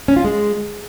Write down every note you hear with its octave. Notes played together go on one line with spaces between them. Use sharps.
C#4
F4
G#3